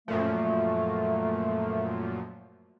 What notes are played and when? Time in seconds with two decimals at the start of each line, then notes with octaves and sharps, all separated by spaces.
0.08 F#2 A#2 F3 A3